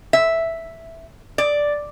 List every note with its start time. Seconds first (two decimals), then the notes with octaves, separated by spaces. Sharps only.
0.13 E5
1.38 D5